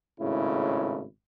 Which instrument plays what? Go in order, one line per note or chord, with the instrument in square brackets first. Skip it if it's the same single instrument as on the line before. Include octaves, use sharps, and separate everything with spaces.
[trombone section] G#1 A2 C#3 E4